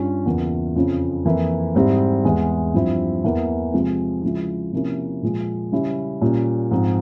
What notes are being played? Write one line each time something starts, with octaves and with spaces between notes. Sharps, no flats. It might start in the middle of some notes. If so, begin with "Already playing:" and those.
Already playing: G2 G3 C#4 F4
E2 C#3 E3 A#3 F4
F2 C#3 F3
F2 E3 A#3 E4
G#2 G3 C4 E4
E2 E3 G#3
G2 F3 C4 E4
E2 E3 A#3 E4
C3 F3 G#3 C4
C#3 F3 G#3 E4
C3 F3 A#3 C#4 E4
A#2 F3 G#3
C#3 G3 C#4 E4
A#2 G3 C#4
G#2 F3 C4